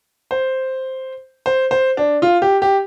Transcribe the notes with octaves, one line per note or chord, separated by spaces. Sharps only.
C5
C5
C5
D4
F4
G4
G4